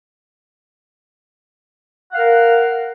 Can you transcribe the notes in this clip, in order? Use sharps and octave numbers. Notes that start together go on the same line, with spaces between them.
A#4 F5 F#5